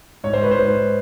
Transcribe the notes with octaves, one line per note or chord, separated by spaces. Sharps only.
G#2 C#5
C5
G#2 B4
C5
G#2